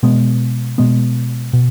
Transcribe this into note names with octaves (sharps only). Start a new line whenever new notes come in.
B2 G#3 B3
B2 G#3 B3
B2